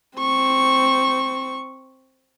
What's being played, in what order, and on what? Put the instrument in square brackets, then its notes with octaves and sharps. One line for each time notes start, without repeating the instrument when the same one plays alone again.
[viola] C4 C#6